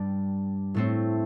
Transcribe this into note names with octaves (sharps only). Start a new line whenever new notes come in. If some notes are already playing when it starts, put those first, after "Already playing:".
Already playing: G2 G3 D4
A2 A3 C4